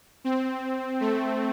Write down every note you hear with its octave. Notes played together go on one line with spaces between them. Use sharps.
C4
A3